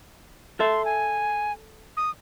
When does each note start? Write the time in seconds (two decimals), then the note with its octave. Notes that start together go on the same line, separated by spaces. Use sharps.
0.60 A4 E5 C6
0.85 G#5
1.97 D#6